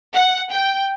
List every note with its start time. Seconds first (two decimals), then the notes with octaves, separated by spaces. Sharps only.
0.13 F#5
0.51 G5